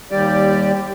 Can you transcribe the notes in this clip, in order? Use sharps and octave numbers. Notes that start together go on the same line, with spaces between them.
D#2 G3 G4 D5